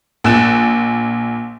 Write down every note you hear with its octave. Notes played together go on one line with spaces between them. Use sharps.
A#1 G#5 F#6 A6 E7